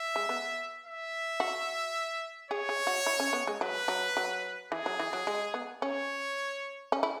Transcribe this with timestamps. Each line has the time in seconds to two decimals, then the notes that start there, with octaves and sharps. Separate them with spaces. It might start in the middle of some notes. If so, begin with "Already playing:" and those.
Already playing: E5
0.16 G#3
0.29 B3
0.85 E5
1.40 F#4
2.51 G#4 C#5
2.69 G#4
2.87 F#4
3.06 E4
3.20 C#4
3.33 B3
3.47 G#3
3.61 F#3 B4
3.88 F#3
4.17 F#3
4.72 E3 G#4
4.86 F#3
5.00 E3
5.13 F#3
5.27 G#3
5.54 B3
5.82 C#4 C#5
6.92 C#4
7.03 E4